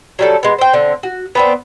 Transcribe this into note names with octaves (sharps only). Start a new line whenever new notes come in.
F#3 G3 A4
G#3 B3
C5 G5
D3 C4
F#4
B3 C4 D4